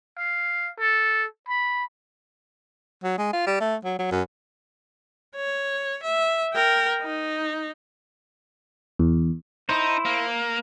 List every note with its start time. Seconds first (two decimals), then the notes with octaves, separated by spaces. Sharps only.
0.18 F5
0.80 A4
1.49 B5
3.04 F#3
3.18 G#3
3.33 F4
3.47 G3
3.60 A3
3.84 F#3
3.98 F#3
4.11 F#2
5.36 C#5
6.03 E5
6.54 A#4 G5
7.02 D#4
8.99 E2
9.69 D#4 E4 C5
10.05 A#3